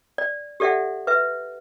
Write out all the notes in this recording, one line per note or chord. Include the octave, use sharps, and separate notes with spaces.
D5
G4 A4 D5 E5 F#5
B4 E5